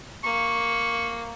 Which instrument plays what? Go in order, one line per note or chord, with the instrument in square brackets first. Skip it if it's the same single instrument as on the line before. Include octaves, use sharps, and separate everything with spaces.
[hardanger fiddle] A#3 [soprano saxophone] C#6